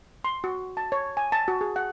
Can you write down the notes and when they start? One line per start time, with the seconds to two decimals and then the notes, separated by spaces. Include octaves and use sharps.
0.24 C6
0.44 F#4
0.77 A5
0.92 C#5
1.17 G#5
1.32 A5
1.48 F#4
1.61 G#4
1.76 F#5